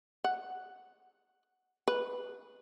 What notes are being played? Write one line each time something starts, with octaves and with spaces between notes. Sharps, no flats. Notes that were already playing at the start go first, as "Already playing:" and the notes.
F#5
B4